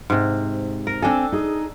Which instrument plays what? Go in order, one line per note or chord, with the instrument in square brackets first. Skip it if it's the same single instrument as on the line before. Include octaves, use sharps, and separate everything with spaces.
[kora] G#2 C3
A#4
[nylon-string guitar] C4 G5 G#5 [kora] D4 A4
[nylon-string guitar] D#4 G#4